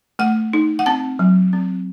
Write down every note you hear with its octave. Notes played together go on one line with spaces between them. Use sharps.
A3 F#5
D#4
F#5
C4 A5
F#3
C4